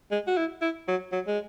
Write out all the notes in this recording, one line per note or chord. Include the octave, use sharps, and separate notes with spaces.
G#3
F#4
E4
E4
F#3
F#3
G#3